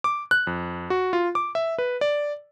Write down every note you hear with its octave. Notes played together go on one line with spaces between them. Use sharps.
D6
F#6
F2
F#4
F4
D6
E5
B4
D5